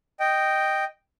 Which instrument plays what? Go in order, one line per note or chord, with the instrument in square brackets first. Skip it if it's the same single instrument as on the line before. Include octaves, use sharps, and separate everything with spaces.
[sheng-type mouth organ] D#5 G5